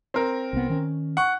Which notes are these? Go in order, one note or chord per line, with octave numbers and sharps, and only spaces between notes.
C4 A#4
C2 B3
D#3 C#4
F#5 C#6